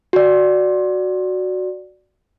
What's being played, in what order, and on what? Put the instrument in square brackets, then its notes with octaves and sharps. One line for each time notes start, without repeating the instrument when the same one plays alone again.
[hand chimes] F#4 D5